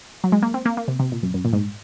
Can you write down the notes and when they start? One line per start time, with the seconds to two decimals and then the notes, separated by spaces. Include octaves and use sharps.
0.24 F#3
0.32 G#3
0.42 A#3
0.54 C4
0.65 A#3
0.77 A#3
0.88 C3
0.99 C3
1.12 A#2
1.23 F#2
1.34 F#2
1.45 A#2
1.53 G#2